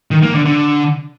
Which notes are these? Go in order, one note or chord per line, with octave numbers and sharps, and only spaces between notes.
D#3
A#3
D3
D3